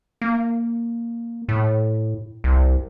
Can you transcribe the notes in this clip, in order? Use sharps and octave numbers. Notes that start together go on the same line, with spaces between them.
A#3
A2
C2